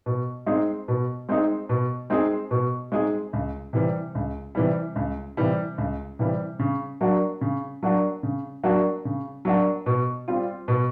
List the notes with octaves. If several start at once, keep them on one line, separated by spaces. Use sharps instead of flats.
B2
G#3 C4 D#4 G#4
B2
G#3 C4 D#4 G#4
B2
G#3 C4 D#4 G#4
B2
G#3 C4 D#4 G#4
C#2
C3 E3 G3
C#2
C3 E3 G3
C#2
C3 E3 G3
C#2
C3 E3 G3
C#3
F#3 A#3 D4 F#4
C#3
F#3 A#3 D4 F#4
C#3
F#3 A#3 D4 F#4
C#3
F#3 A#3 D4 F#4
B2
G3 C4 F4
B2